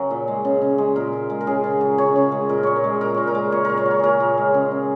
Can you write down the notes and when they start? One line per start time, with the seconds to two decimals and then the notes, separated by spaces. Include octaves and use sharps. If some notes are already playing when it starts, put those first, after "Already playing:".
Already playing: C#3 F#3 A#4
0.11 A#2
0.28 G#3
0.45 C#3
0.62 C#3
0.78 G#3
0.96 A#2 A#4
1.13 A#2
1.30 G#3
1.41 A#4
1.47 C#3 G#4
1.64 C#3
1.81 F#3
1.98 C#3 C#5
2.16 C#3
2.32 G#3
2.49 A#2 A#4
2.63 A#2 C#5
2.76 A#4
2.84 G#3
3.01 A#2 A#4
3.15 A#2 C#5
3.27 A#4
3.35 G#3
3.52 A#2 C#5
3.65 A#2 A#4
3.77 C#5
3.86 F#3
3.91 C#5
3.99 A#2 G#4 A#4
4.20 A#2
4.38 G#3
4.54 C#3
4.71 C#3